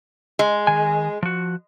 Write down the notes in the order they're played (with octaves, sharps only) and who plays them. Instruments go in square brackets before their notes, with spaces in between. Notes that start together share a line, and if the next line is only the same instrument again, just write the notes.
[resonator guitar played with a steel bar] G#3
[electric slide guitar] D#3 G#5
F3 F#4